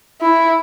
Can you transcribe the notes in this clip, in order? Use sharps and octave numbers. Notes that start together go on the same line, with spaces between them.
E4